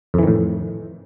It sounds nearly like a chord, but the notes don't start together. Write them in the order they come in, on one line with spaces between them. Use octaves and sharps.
F2 E3 D#3 A2